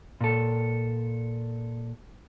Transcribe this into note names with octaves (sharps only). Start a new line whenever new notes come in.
A#2 A4